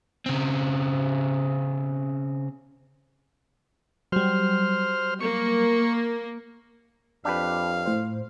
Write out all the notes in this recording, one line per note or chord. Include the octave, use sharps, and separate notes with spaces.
C#3 C4
F#3 G3 C5 F6
A#3 C#6
F2 D4 G4 B4 F5
A2 C5